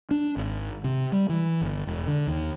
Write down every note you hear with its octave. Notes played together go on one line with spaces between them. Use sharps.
D4
G#1
C3
G3
E3
G1
E1
D3
D#2